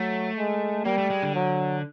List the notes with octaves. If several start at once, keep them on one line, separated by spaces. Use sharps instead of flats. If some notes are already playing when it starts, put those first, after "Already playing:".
Already playing: F#3 A3
G#3
G3 A#3
A3
G#3
D3
F#3